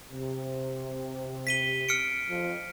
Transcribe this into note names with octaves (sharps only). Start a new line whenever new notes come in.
C3
B6 D#7 G7
F6 C#7 D7
F2 F3